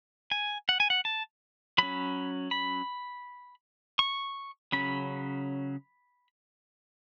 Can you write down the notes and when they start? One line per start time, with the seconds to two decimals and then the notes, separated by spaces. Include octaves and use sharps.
0.31 G#5
0.69 F#5
0.80 G#5
0.90 F#5
1.05 A5
1.78 F#3 C#4 B5
2.51 B5
3.99 C#6
4.72 C#3 F#3 C#4 B5